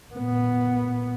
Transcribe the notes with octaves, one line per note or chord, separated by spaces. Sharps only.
A#2 B3